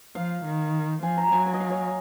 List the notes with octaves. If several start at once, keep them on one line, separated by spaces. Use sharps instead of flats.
F3 F5
D#3
F3 G#5
A#5
F#3 G#5
G#5
D#5
F5
C#5